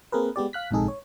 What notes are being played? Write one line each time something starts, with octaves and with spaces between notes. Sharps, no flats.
A#3 C4 G#4 A#4 B4
G#3 B3 G4 D5
F5 F#6 B6
A#1 G#2 C3 D#4 G#4 A4
C#5